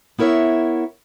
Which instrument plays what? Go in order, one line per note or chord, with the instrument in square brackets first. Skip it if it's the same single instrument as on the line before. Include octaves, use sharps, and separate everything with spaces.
[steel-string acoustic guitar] B3 E4 A#4 C#5 E5